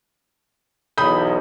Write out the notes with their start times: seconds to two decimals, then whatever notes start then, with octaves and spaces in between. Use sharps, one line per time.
0.98 B1 E2 B5 D#6 G6